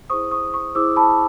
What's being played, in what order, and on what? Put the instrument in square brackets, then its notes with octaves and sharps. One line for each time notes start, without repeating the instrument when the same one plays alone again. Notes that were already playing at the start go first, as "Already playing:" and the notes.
[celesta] E4 G#4 C5 C#6 D#6
C#6 D#6
C#6 D#6
E4 G#4 C5 D6 E6
A5 B5